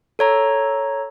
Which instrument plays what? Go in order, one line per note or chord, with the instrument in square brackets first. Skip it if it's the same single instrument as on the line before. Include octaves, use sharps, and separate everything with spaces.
[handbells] A4 C#5 A#5